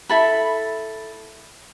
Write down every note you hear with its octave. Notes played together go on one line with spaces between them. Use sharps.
E4 A4 B5